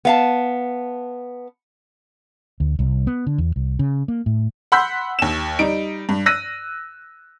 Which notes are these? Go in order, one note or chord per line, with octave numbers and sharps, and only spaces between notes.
B3 F5 A5
D2
C2
B3
D3
E2
C2
C#3
A#3
A2
F#5 B5 C6 E6 G6 B6
D#2 E7
G3 D#4 D7
G2
E6 F#6 A#6 D#7